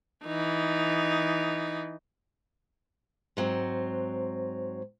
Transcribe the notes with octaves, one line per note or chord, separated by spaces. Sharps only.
E3 D#4
G#2 F#3 C4